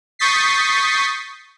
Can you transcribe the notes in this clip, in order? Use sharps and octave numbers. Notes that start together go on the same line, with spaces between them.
C#6 D#6 G6 A6 B6 C7